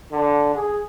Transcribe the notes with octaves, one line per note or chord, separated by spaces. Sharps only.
D3
G#4